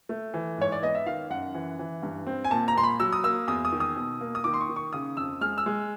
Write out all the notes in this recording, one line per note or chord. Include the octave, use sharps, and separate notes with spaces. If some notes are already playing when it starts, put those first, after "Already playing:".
A3
E3
G#2 C#5
D5
B3 D#5
E5
D#3 F5
F#2 F#5
E3
E3
G2
C4
G#5
A#2 A5
A#5
A#2 C6
B5
F#3 E6
D#6
A#3 E6
E2 D#6
D#6
D#3
D#6
B2
A#3
D#6
D#3 D6
C6
C#6
D#3
C#6
C#3 D#6
F2 E6
G#3 F6
E6
G#3